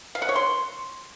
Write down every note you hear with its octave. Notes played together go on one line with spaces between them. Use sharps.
F5
F#5
C#5
C6